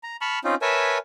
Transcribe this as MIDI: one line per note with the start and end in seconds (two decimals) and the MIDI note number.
0.03 0.17 82
0.21 0.39 81
0.21 0.39 83
0.21 0.39 85
0.21 0.39 89
0.44 0.55 60
0.44 0.55 61
0.44 0.55 63
0.44 0.55 65
0.62 0.98 70
0.62 0.98 71
0.62 0.98 73
0.62 0.98 76
0.62 0.98 80
0.62 0.98 81